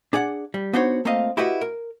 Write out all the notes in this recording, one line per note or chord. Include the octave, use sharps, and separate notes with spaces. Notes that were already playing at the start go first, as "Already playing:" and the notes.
D4 G#4 D5 F#5
G3
B3 D4 D#4 F#4 C5 C#5
A3 A#3 C4 F4 D#5 F5
E4 F#4 G4 B4 D#5 F#5
A#4